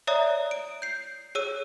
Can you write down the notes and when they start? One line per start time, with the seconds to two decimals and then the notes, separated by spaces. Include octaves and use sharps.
0.07 C#5 D5 E5 A#5 D#6
0.51 D7
0.82 G6 C7
1.35 G#4 C#5 E6 D#7